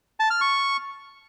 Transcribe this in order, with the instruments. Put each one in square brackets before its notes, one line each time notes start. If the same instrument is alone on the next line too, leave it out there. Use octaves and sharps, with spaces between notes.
[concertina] A5
F6
C#6